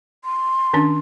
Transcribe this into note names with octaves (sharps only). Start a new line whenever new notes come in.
C6
D#3 C#4 D4